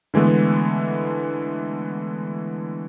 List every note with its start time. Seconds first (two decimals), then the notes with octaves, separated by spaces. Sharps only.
0.14 D3 E3 G#3 A3 B3